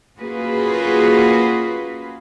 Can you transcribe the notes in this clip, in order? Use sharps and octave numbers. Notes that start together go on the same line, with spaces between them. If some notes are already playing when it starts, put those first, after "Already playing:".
A#3 C#4 F4 F#4 G#4 B4